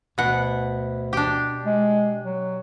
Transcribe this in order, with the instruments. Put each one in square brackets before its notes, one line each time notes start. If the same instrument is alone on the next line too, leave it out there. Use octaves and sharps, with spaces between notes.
[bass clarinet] D2 [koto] B2 F#5
[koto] D4 G4
[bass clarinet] G#3
F#3